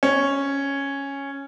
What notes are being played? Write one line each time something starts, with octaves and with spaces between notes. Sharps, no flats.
C#4